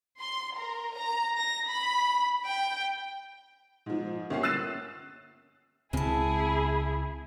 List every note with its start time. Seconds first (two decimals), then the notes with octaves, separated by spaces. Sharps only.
0.20 C6
0.56 A#4
0.96 A#5
1.37 A#6
1.68 B5
2.47 G5
3.86 G#2 F3
4.30 G1 A#3 C#4 C7
4.43 E6 F#6 A6 C7 D#7 E7
5.93 C#2 C#3 C4 E4 G#4 G#5 A5